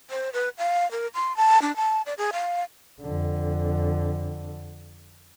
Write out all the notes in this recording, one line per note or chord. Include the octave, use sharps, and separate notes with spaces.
C5
B4
F5
A#4
C6
A5
D4
A5
D5
G#4
F5
F2 D3